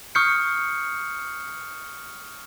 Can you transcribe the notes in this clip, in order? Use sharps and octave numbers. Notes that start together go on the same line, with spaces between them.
C#6 D#6 F6 G6 C7 C#7